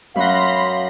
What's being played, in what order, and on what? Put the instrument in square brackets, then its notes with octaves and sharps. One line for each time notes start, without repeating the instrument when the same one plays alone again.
[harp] F#2 C#4 F#5 [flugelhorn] F5 [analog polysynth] B5 C6 A#6